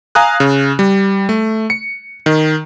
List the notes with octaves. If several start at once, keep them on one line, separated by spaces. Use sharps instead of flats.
F5 G#5 A#5 D#6 F#6
C#3
G3
A3
C#7
D#3